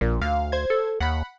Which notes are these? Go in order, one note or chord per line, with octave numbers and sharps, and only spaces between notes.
A#1 A#2
D2 F5
C5 G#6
A4
D#2 F#5 B5